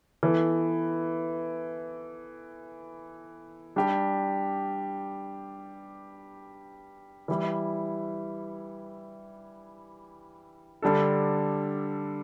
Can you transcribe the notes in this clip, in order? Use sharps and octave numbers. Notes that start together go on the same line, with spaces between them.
E3 B3 E4 A4
G3 D4 G4
E3 G3 E4
D3 G3 D4 A4